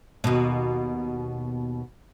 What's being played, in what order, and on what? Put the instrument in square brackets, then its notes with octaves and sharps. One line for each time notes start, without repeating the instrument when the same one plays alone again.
[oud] D#2 B2